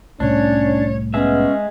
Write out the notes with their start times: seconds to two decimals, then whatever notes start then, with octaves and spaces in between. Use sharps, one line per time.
0.20 C2 A2 C#4 D4 C#5
1.14 G#3 B3 C#4 G#4 E5